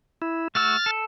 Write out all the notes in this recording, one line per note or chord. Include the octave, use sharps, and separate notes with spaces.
E4
A3 F#4 E6 F6 A6
A4